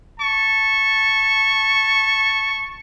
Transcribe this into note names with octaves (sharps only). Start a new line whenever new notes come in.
A5 C#6